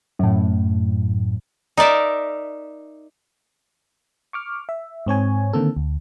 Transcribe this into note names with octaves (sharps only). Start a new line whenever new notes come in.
F#2 A2
D#4 A#4 D5 E5
C#6 D6 F6
E5
G#2 C4 C#5 G#5
D3 D#3 A#3 C4 A4
D2